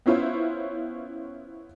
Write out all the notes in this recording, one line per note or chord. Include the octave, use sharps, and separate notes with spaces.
B3 C#4 E4 F4 C5